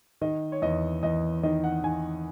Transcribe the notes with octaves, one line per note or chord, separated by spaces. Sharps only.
D#3 D#5
C#5
E2 D#5
E2 D#5
D#3 D#5
F#5
D#3 G#5